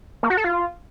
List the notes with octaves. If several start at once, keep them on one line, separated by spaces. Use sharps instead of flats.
A#3
F#4
A4
F4